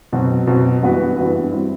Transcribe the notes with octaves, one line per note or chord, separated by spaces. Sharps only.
B2 F#3 C4
B2 F#3 C4
G2 E3 B3 F#4 B4
G2 E3 B3 F#4 B4
G3 C4 E4